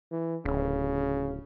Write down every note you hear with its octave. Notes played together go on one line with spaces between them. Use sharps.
E3
D1 C#3